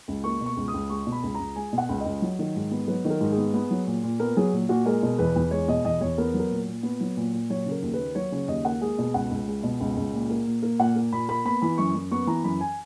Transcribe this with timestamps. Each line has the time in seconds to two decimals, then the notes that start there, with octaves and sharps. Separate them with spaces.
0.08 C#2
0.24 A#3 C#6
0.41 B2
0.46 C#6
0.57 C#2
0.68 D#6
0.74 C#2
0.90 G#3 C#6
1.07 B2
1.12 B5
1.23 C#2
1.35 C#2 A#5
1.56 G#3 G#5
1.73 B2
1.78 F#5
1.89 C#2
2.00 D#5
2.06 C#2
2.22 F#3
2.39 D#3
2.55 G#2
2.71 B3
2.88 F#3 B4
3.05 D#3
3.10 A#4
3.21 G#2
3.32 G#4
3.37 B3
3.54 B3
3.71 F#3
3.87 A#2
4.03 A#2
4.20 B3 A#4
4.37 F#3 G#4
4.53 A#2
4.69 A#2 F#4
4.85 G#3 A#4
5.03 B2
5.19 E2 B4
5.35 E2
5.51 G#3 C#5
5.68 B2 D#5
5.85 E2 D#5
6.01 E2 C#5
6.18 B3 A#4
6.34 F#3
6.39 A#4
6.51 A#2
6.67 A#2
6.83 B3
7.01 F#3
7.17 A#2
7.33 A#2
7.50 F#3 C#5
7.66 C#3
7.71 A#4
7.82 D#2
7.93 B4
7.99 A#3
8.15 F#3 C#5
8.32 C#3 C#5
8.48 D#2 D#5
8.65 A#3 F#5
8.81 G#3 G#4
8.98 B2
9.14 C#2 F#5
9.31 C#2
9.47 G#3
9.63 B2
9.80 C#2
9.97 C#2
10.13 A#2
10.30 A#3
10.47 A#2
10.62 A#3
10.79 A#2 F#5
10.96 A#3
11.12 A#2 B5
11.28 A#3 B5
11.45 B3 B5
11.62 E3 B5
11.78 F#2 C#6
11.95 F#2
12.11 B3 C#6
12.27 E3 A#5
12.44 F#2 B5
12.61 G#5